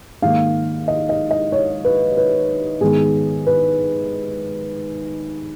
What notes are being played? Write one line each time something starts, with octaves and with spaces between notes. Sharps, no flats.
G#2 D#3 A#3 F5
D#5
D#5
D#5
C#5
B4
B4
G#2 D#3 G#3 B3 G#4
B4